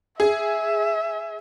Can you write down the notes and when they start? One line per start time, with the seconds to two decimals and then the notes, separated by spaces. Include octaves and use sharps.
0.20 G#4 E5